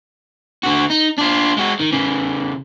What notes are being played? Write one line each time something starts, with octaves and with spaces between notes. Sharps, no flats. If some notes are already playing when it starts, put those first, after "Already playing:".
D3 F#4
D#4
D4 F4
G#3 F#4
D#3
C#3 E3